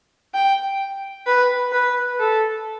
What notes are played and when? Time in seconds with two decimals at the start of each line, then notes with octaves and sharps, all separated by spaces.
0.34 G5
1.27 B4
1.72 B4
2.19 A4